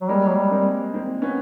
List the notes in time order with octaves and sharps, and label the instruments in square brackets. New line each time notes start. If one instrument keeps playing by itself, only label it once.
[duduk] F#3
[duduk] G3 [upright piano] G#3 A#3
[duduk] F#3
G3
[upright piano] A#3 C4
A#3 C4
B3 C#4